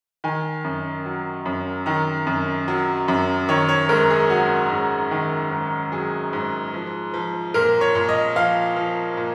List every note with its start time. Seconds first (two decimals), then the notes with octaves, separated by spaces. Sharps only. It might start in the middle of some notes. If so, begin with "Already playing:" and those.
0.24 D#3 G#5
0.64 F#2
1.06 F#3
1.46 F#2
1.86 D#3 A#5
2.27 F#2
2.68 F#3
3.08 F#2
3.49 D#3 C#5
3.69 C#5
3.89 G#2 A#4
4.10 G#4
4.30 F#3 F#4
4.70 G#2
5.11 D#3
5.51 G#2
5.92 F#3 G#4
6.33 G#2
6.74 F3
7.14 F3
7.54 A#2 A#4
7.81 C#5
7.95 A#2
8.09 D#5
8.36 F3 F5
8.76 F3
9.17 A#2